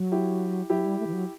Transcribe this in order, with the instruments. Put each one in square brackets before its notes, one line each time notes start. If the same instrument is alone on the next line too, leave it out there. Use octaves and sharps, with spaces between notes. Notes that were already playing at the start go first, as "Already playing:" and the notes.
Already playing: [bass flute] F#3
[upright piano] E4 G4
[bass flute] F#3 [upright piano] E4 G4
[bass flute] G3
A3
E3
F#3